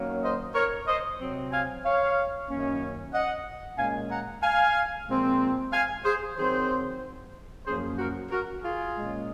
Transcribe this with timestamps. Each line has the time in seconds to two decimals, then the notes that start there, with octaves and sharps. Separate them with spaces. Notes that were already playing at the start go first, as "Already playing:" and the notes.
Already playing: D#3 F#3 A#3 C#4
0.23 C5 D#5
0.55 A#4 C#5
0.88 C5 D#5
1.19 C3 F#3 C4
1.52 F5 G#5
1.84 C#5 F5
2.49 F#2 D#3 A#3 C#4
3.14 D#5 F#5
3.78 A#2 G#3 C#4 F5 G#5
4.10 F#5 A#5
4.43 F5 G#5
5.08 A#2 F3 G#3 C4
5.72 F5 G#5
6.04 G#4 C5
6.37 D#3 F#3 C4 G#4 C5
7.66 F#2 F3 A#3 C#4 G#4 C5
7.99 F#4 A#4
8.31 F#4 A#4
8.63 F4 G#4
8.95 A#2 G#3 C#4